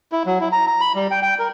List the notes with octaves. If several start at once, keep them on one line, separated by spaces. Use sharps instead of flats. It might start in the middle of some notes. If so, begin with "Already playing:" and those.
E4
F#3
E4
A#5
A#5
B5
G3
G5
G5
A#4